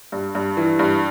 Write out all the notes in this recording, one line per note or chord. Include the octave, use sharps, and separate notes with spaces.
G2
G2
E3
G2